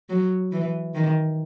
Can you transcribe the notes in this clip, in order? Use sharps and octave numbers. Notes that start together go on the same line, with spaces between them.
F#3
E3
D#3